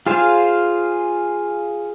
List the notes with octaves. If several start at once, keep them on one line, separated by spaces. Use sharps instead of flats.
F4 G#4 C5 F5